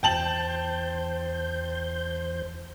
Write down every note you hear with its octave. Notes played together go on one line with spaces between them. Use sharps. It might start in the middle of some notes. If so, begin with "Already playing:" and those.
E2 C5 G5 A5 G6 F#7